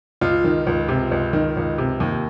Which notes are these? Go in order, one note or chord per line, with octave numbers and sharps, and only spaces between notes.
C#2 F4
D#3
C#2
C3
C#2
D#3
C#2
C3
D#2